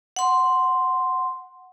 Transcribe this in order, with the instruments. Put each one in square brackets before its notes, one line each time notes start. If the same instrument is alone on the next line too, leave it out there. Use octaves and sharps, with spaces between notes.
[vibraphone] F#5 C6